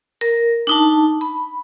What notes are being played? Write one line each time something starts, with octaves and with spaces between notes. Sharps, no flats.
A#4
D4 D#4 A5
B5